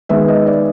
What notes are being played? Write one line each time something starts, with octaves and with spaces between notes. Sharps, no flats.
D#3 G#3 B3 E5
D#5
D5